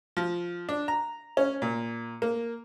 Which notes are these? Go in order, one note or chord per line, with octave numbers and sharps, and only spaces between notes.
F3
D4
A#5
C#4
A#2
A#3